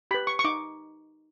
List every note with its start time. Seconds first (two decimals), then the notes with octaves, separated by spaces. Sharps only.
0.11 G4 B4 B5
0.27 C#6
0.39 C#6
0.44 D#4 D6